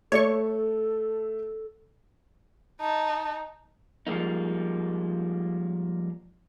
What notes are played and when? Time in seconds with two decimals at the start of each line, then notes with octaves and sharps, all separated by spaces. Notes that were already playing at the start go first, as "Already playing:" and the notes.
0.12 A3 A4 C#5 D5 C#6
2.81 D#4 A5
4.07 F3 G3 G#3 A#3 D#4